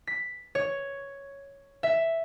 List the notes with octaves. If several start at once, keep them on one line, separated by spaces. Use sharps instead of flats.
B6
C#5
E5